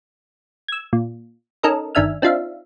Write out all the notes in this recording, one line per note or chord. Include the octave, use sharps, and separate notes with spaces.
E6 G#6
A#2
C#4 D#4 A4 A#4 D#5
G1 D#3 D4 E5 G#5 F6
C4 D4 D#4 F4 E5 F5